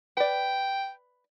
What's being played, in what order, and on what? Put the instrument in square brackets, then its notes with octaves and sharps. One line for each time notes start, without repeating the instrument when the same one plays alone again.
[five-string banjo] B4 D5 [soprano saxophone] G5